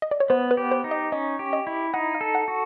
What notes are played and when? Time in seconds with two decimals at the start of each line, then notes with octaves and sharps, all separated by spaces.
0.02 D#5
0.11 D5
0.20 C#5
0.30 B3 C5
0.51 B4
0.57 G4
0.71 C5
0.84 D#4
0.91 D#5
1.12 C#4 D#5
1.39 G4
1.53 D#5
1.67 E4
1.94 D#4 F#5
2.14 F5
2.21 A4
2.35 F#5
2.48 F#4